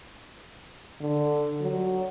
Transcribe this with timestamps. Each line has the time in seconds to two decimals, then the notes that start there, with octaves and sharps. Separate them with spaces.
1.01 D3
1.61 F#3